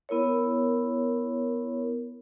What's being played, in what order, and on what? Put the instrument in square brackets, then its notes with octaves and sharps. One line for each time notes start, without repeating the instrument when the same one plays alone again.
[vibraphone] B3 E4 A#4 C#5